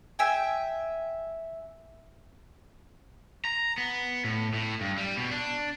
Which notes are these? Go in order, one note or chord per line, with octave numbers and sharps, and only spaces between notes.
E5 G5 G#5
A#5
B3
A2
A2
G2
G3
B2
D4